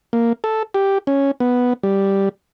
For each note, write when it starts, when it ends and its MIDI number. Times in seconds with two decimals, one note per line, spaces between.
0.13 0.33 58
0.44 0.63 69
0.74 0.98 67
1.07 1.31 61
1.40 1.73 59
1.83 2.29 55